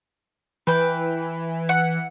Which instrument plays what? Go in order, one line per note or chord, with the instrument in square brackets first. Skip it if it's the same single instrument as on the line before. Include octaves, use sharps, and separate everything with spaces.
[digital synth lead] E3 [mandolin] B4 G5
[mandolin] F#5